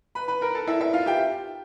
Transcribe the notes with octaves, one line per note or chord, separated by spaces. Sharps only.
B4 B5
B4 B5
A#4 A#5
A4 A5
E4 E5
E4 E5
F4 F5
G4 G5